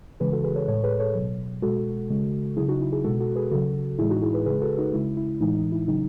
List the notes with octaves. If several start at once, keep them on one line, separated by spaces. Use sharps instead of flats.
C#3 E3 G#3 G#4 B4
F#4 A4
G#4 B4
A4 C#5
A2 G#3 A4 C#5
G#4 B4
A4 C#5
B2 F#3
B2 G#3 F#4 A4
C#3 G#3
C#3 F#3 E4 G#4
D#4 F#4
E4
E4 G#4
B2 G#3 F#4 A4
F#4 A4
G#4 B4
C#3 F#3 F#4 A4
A2 E3 G#3 E4 G#4
D#4 F#4
E4 G#4
G#4 B4
C#3 G#3 G#4 B4
F#4 A4
D#4 F#4
C#3 G#3 E4
E4
A2 E3 G#3 D#4
D#4
E4
C#3 F#3 D#4